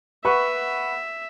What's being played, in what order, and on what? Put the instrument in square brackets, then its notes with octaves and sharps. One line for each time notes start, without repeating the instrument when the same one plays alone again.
[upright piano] B4 F#5 C#6 [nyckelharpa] E5